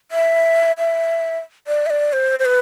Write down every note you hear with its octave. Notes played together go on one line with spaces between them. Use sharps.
E5
E5
D5
E5
D5
C5
C5
B4